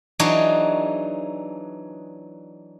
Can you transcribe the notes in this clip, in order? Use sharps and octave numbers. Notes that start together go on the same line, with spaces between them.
E3 F#3 D4 D#4 G#4 C#5